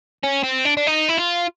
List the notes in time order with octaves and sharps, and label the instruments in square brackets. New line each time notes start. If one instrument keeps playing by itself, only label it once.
[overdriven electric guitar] C#4
C4
D4
D4
D#4
E4
F4